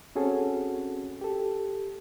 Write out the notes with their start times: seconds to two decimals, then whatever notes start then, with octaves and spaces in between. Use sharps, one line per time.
0.15 C4 C#4 F#4 G#4 A4
1.21 G4 A4